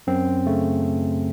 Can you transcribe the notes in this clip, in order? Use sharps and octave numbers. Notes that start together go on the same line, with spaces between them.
F#2 C4
C#3 A3